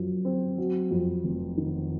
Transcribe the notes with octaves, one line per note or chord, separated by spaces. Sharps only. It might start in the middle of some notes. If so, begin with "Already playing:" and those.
Already playing: F#2 F3
C4
F#3
F2
F1
D#3